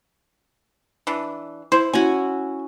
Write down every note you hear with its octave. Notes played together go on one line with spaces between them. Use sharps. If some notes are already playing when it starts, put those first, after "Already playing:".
E3 D4
E4 C5
C#4 E4 F#4 G#5